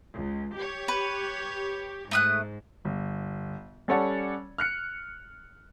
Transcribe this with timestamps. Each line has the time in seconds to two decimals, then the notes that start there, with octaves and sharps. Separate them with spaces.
0.13 C#2
0.55 G4 C#5
0.88 B4
2.11 G#2 A3 D#6 F#6
2.85 G1
3.88 G3 C#4 A4 C#5 D5 F#5
4.58 F6 F#6 C#7